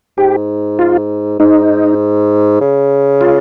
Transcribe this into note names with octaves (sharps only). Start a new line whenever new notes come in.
G#2 G4
F4
G#2 D#4
C#3
F4